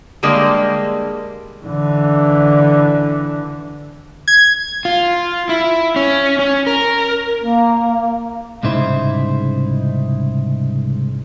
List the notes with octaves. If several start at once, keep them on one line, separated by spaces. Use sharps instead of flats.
D3 G3 G#3 A#3
D3 E3
G#6
F4
E4
C#4
C#4
A#4
A#3
C2 G#2 C#3 D#4 E4 C5